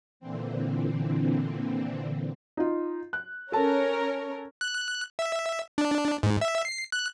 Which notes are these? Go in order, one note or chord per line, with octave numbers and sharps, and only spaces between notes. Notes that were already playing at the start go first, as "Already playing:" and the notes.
A#2 D3 E3 C4
D#4 F4
F#6
C#4 A4 A#4 C#5 A5
F#6
E5
D4
G#2
E5
C7
F#6